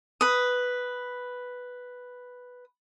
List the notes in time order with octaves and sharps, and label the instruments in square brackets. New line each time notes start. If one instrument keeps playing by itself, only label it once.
[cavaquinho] B4 D#6